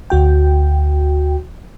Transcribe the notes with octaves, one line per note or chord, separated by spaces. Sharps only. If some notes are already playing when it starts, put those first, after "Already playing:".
D2 F#4 G5